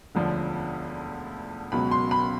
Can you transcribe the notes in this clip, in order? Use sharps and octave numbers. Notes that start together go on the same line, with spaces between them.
E1 D2 D3 F3
C#2 B2 F#3 B5
C6
B5